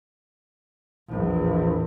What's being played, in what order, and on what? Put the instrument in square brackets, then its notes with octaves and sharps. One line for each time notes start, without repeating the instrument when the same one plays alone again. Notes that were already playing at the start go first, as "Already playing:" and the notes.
[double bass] A#1 E2